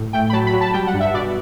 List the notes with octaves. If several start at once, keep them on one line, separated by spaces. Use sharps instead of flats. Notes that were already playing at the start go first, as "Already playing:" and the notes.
Already playing: A2
A3 G5
B5
F#3 A5
B5
F#3
A5
G3 G5
F#5
G2
E5
B2 D5